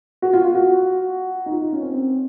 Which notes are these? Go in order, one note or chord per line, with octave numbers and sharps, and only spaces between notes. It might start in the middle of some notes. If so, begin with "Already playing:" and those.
F#4
F4
F4
F#4
D#4
F4
D#4
C#4
C4
C4